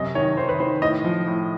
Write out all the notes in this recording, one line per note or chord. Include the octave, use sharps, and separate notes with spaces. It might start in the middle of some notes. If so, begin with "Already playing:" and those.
Already playing: F#2 C3 D#5
D#3 C#5
D#3 C5
B4
D#3 C5
A2 D#5
F3
A2